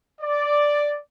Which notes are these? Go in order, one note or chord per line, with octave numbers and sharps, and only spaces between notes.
D5